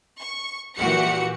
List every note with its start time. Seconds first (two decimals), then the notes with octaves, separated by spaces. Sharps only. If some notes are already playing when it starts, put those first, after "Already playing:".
0.20 C#6
0.76 A#2 E3 F#4 G4 F#5 C#7